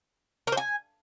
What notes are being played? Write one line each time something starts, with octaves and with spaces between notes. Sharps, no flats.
A#4
C5
G#5